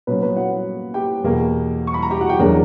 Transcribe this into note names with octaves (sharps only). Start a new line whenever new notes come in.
A#2 F#3 B3 C#4 B4
B3 B4
F#4 F#5
G4 G5
E2 B2 A#3
C#6
B5
A#5
G4 G5
F#4 F#5
G4 G5
E2 D3 F#3 A#3 D4 A#4 A#5